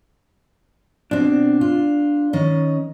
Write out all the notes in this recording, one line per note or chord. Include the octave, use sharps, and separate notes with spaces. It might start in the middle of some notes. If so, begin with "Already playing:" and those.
B2 C4 D4
F4
D#3 C#4 D#5